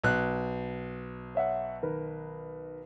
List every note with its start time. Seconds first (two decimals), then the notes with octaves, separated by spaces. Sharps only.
0.03 B1 F#6
1.35 C#5 E5 F#5
1.83 D#3 A#4 B4